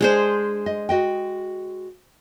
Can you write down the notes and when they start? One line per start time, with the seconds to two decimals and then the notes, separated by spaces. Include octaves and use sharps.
0.01 G#3 D4 G#4 C5
0.66 D#5
0.89 F#4 D#5 G5